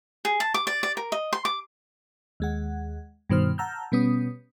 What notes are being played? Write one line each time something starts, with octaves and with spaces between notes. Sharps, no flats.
G#4
A5
D6
D5
D5
A#4
D#5
C6
D6
D#2 G#3 F#5
G2 B2 D#3 C5 F6
F#5 A5 A#5 E6 F6 G6
B2 G3 B3 C#4 D#6